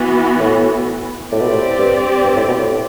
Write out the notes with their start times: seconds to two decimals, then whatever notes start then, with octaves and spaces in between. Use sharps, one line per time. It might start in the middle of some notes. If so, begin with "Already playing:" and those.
Already playing: E3 B3 F#4
0.39 A2
1.32 A2 C4 G4 D5
1.41 B2
1.49 A2
1.78 G2
2.24 G2
2.36 A2
2.48 B2
2.59 A2